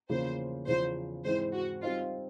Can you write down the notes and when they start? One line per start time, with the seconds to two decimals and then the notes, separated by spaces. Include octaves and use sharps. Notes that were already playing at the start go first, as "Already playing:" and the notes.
0.10 E2 C#3 F3 A#3 C#4 C5
0.67 E2 C#3 F3 C5
1.25 G#2 E3 G#3 C4 E4 C5
1.54 F#4
1.83 G3 C4 D#4 F4